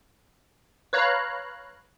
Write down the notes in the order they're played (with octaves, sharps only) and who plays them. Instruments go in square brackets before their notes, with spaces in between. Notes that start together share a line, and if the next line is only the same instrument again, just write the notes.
[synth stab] B4 C#5 F5 A#5 F#6